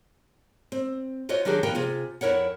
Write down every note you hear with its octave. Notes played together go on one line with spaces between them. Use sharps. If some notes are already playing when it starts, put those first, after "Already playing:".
C4
F4 F#4 C5 C#5 D#5
D#3 F#3 D4 G4 G#4
D#3 F3 B3 A#4 G5
C3 F4 G#4
F2 E4 A#4 C#5 F#5